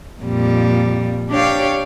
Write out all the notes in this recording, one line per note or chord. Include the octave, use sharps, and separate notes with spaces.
F2 A#2 G3
D4 G4 C#5 F5 G5